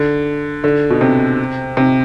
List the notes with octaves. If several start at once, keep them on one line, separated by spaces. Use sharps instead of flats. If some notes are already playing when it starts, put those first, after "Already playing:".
Already playing: D3
D3
B2
C3
C3